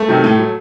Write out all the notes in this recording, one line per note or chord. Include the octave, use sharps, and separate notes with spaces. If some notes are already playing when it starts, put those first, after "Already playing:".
Already playing: A3
C3 D#3 F#3
A2
F#3